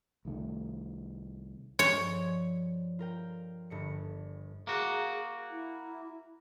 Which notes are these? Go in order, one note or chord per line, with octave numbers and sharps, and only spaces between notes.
C2 D#3 F3 A3
G2 F3 G#3 C#5
F4 A#4 G5
G1 G2 C#7
A#3 F#4 G#4
E4